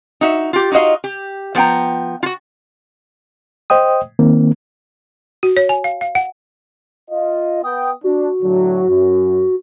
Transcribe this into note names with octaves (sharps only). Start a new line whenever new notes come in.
D#4 F#4 E5
F4 G4
D#4 F4 F#4 D#5 F5
G4
F3 B3 G#4 G5 A#5
F4 F#4
C5 D#5 G5 D#6
D#3 A#3 C4
F#4
C#5
G#5
F5
F5
F#5
F4 D#5
B3 G5 D#6
D4 F#4
A2 D3 F#3
F#2